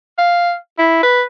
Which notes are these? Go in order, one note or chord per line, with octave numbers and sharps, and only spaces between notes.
F5
E4
B4